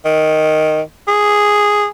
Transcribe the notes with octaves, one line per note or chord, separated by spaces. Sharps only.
D#3
G#4